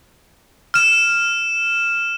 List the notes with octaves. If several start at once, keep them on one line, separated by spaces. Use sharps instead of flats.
F6 E7